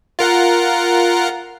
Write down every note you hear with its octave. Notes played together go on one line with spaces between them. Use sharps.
F4 A#4 F#5